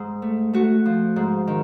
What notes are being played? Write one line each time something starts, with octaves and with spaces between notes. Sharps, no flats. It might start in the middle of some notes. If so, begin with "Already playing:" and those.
Already playing: G#2
A3
A3 F#4
F3
G#2
D#3